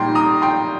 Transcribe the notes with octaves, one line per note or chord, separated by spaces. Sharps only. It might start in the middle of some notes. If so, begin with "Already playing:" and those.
Already playing: A#2 G3 D#4 G5 A#5 C6
A#5 D#6
G5 C6